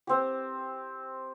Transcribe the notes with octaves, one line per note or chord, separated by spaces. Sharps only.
C4 G4